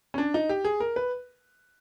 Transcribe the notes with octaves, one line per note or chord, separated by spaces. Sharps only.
C#4
D4
D#4
G4
G#4
A#4
B4